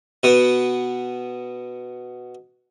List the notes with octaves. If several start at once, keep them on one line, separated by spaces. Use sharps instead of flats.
B2 B3